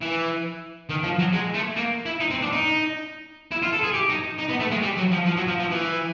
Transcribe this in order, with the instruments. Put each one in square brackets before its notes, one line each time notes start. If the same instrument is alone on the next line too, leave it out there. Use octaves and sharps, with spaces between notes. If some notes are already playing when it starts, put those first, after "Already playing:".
[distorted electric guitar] E3
D#3
F3
F#3
G#3
A3
A#3
E4
D#4
C4
D4
D#4
E4
F4
A4
G#4
G4
D#4
D#4
B3
A3
G#3
G3
F#3
F3
F3
F#3
F3
F3
E3